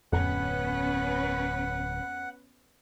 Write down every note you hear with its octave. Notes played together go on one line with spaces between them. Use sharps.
D1 F2 B3 C#4 B4 F#5